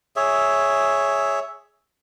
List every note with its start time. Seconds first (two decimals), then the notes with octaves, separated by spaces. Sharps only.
0.16 G#4 C#5 E5